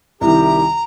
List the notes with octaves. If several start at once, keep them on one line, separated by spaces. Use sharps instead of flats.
C2 D#3 E4 G4 A#5